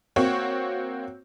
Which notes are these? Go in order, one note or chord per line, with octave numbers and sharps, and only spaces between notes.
A#3 C4 F#4 C#5